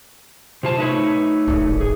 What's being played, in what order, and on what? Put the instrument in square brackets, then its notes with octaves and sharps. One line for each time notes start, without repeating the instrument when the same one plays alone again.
[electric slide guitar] C3 F4 A5 [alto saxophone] C5
[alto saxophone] A3 [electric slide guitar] D#4 B4 C#5
[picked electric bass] D1 G#1
[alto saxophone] G#4